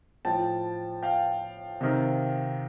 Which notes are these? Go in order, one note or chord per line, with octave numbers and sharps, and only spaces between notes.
A2 F3 G5 A5
F5 G5
C3 D#3